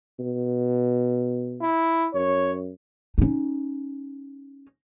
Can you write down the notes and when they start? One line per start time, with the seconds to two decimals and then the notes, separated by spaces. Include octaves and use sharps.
0.19 B2
1.62 E4
2.14 F#2 C#5
3.18 C#4 D#4